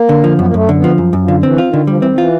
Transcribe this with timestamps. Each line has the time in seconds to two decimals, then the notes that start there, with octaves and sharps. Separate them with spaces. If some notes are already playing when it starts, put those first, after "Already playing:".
Already playing: A#3
0.09 D3
0.24 F3
0.38 F#2 B3
0.46 A#3
0.54 F#2 A3
0.69 D3
0.76 B3
0.84 F3
0.98 F#2
1.13 F#2
1.20 F3
1.28 D3
1.43 E3 C4
1.58 F4
1.66 D#3
1.73 D3
1.87 F3 G3
1.97 E3
2.02 D#3 C4
2.16 E3 F4